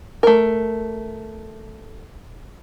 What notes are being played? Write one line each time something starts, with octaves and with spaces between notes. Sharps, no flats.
A3 A#4